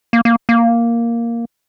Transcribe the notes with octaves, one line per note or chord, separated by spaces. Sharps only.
A#3
A#3
A#3